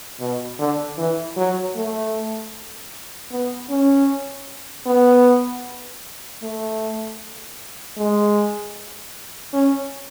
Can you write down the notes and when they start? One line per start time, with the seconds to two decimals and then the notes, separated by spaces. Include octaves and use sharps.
0.20 B2
0.59 D3
0.98 E3
1.37 F#3
1.76 A3
3.31 B3
3.70 C#4
4.86 B3
6.43 A3
7.97 G#3
9.53 C#4